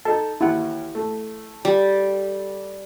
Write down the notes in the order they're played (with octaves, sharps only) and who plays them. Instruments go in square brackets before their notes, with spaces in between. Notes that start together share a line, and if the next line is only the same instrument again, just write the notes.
[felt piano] D#4 A4 [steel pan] A5
[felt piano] D#2 [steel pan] E4 F#5
[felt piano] A3
[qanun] G3